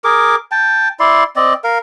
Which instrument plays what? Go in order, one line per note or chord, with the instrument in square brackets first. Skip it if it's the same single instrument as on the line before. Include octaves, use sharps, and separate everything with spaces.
[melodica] G#4 A#4 D6
G5 A5
E4 D5 C6
C4 D5 D#5
A#4 F5